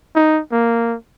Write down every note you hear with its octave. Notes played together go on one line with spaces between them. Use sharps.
D#4
A#3